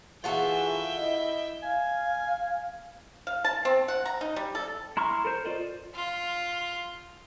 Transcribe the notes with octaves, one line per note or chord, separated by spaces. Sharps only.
E3 F4 F#4 G#4 A4 E5 G5
E4 D#5
F5 G#5
F5
A5
C4
F#5
A#5
D#4
G3
A4
E4 A#5 C6 C#6 F6
A4 A#4 C5
F4 C5 D5 D#5
F4